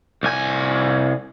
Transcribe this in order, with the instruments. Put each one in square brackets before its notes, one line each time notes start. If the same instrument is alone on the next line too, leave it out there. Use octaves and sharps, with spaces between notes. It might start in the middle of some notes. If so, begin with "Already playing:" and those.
[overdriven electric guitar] C2 G#5